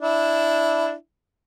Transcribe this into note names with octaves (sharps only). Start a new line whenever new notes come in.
D4 E4